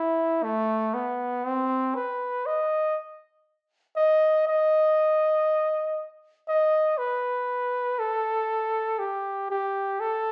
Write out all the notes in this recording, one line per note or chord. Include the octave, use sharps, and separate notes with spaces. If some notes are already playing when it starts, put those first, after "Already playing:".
Already playing: E4
A3
B3
C4
B4
D#5
D#5
D#5
D#5
B4
A4
G4
G4
A4